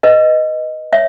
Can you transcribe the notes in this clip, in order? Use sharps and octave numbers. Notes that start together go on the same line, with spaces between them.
B4 D#5
C#5 E5